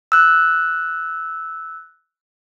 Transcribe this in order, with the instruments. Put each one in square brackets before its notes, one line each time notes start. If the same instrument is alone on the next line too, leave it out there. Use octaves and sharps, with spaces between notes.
[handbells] E6 F#6